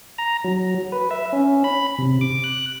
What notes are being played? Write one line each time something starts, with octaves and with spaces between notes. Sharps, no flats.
A#5
F#3
B4
E5
C#4
B5
C3
D6
F#6